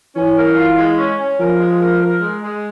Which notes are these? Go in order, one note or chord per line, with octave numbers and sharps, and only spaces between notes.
E3 C#4
A#4
F4
G#3
C#4
C#4
F3 A#4
G#3
A#4
A#4
G#3
G#3